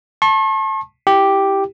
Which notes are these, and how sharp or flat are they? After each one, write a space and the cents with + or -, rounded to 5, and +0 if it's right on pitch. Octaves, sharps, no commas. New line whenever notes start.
A5 +0 C#6 -45
E4 -15 G4 +0